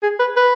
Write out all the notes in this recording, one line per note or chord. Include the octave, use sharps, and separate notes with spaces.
G#4
B4
B4